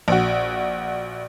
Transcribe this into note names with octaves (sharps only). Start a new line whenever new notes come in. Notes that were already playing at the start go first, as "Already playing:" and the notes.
A#1 F#4